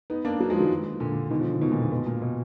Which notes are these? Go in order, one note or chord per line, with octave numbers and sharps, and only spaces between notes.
B3 D#4
A#3 D4
F#3 A#3
F3 G#3
D#3 F#3
A#2 D3
B2 D#3
D3 F3
B2 D#3
A#2 D3
A#2
B2
A#2
B2